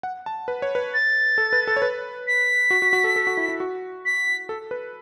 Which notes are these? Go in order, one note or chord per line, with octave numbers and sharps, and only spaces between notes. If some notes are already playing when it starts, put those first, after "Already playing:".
F#5
A5
B4
C#5
B4
A6
A4
B4
A4
C#5
B4
B6
F#4
F#4
F#4
A4
A4
F#4
E4
E4
F#4
B6
A4
B4